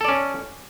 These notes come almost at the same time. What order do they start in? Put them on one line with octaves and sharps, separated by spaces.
A4 D5 C#4